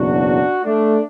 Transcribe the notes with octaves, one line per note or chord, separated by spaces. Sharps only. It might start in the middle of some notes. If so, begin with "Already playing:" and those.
Already playing: F#1 E2 B2 F#3 D4 F#4
A3 D4